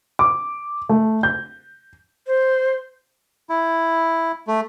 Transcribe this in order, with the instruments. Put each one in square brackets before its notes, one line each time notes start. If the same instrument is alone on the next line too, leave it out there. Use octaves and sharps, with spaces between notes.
[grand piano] D6
A3
G6
[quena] C5
[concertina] E4
A3